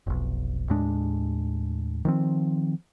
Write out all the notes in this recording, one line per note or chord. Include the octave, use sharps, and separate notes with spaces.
F1 B1
D#2 A2 G#3 D4
D#3 F3 C4